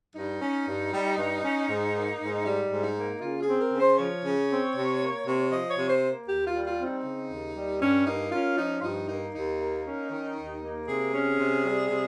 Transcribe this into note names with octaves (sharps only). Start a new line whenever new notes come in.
G2 D#4
C#4
G2
G3
G2
C#4
G#2
A#3
G#2
G3 D#4
G#2
D#4
A#3
C#3 F4
G#4
C4
A#4
C#3
C5
F3 C#5
C#3
C4
C3
A#3
C3
F3 D#5
C#5
C3
C5
A#3
D#2 G4
F4
G3
F4
C4
D#4
C#3
D#2
G3
G2 C#4
A#3 D#4
C#4 F4
F3 D#4
F4
G2 D#4
A#3 D#4
D#2 D#4
A#3
C#4
D#3
D#2
A#3
C3 G#4
C#4
C3
G3
C3